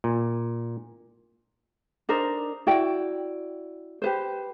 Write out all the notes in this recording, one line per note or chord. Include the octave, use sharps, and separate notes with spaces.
A#2
D4 D#4 A#4 C5
E4 F#4 D5 G5
G4 B4 C5